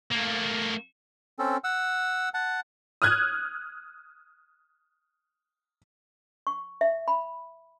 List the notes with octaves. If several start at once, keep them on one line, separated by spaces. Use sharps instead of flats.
A3 A#3
C4 C#4 A4
F#5 E6
F#5 A5
D#6 F6 F#6 G#6
C#6
E5
B5